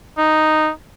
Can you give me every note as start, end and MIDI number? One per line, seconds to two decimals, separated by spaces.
0.18 0.69 63